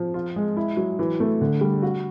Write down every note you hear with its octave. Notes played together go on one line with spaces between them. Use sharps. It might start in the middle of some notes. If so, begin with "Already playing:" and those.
Already playing: F3
F4
G#3
E4
F#3
E3
A3
D3
G3
F#4